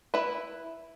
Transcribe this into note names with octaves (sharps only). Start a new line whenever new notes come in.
E4 B4